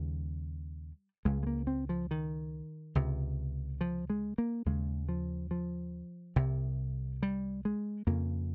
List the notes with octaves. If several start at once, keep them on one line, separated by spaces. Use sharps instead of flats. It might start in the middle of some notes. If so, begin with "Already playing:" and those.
Already playing: D#2 C#3 G3
C#2 C#3 G#3
G#3
A#3
C4
F3
D#3
C#2 C3
F3
G#3
A#3
D#2 C#3 G#3
F3
F3
C2 C3
G3
G#3
F2 C#3 A#3